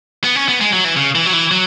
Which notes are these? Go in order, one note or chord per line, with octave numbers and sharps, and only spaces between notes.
B3
C#4
B3
G#3
F#3
E3
C#3
E3
F#3
E3
F#3